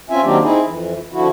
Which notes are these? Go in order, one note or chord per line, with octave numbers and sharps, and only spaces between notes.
C4 C#4 F4 E5 G#5
D#3 F#3 A#3 C4 D4 G4
C4 D#4 E4 G#4
F2 E3
D3 F3 E4 F#4